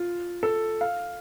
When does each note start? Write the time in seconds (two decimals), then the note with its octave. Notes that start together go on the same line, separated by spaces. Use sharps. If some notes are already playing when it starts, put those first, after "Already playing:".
Already playing: F4
0.43 A4
0.81 F5